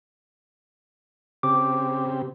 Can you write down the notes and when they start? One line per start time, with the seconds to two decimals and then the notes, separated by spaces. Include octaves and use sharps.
1.43 C#3 C4 G4 D6